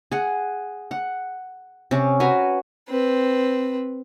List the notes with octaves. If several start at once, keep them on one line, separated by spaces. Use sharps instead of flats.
G#4 F#5
F#5
C3 C#4
F#4 B4 G#5 A#5
C4 B4